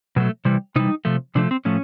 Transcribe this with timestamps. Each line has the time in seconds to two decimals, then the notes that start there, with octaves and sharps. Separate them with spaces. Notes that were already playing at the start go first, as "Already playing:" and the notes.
0.16 B2 F#3 A3
0.45 C3 E3 G3
0.76 C3 E3 G3 D#4
1.05 C3 F3 A3
1.35 C3 F3 A3 D4
1.51 C4
1.65 A2 F3 A3 C#4